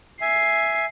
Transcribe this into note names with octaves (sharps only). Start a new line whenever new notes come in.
E5 G#5 C7